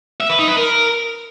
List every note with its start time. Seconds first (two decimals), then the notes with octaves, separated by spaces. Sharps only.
0.20 E5
0.30 B4
0.39 D#4
0.48 B4
0.57 A#4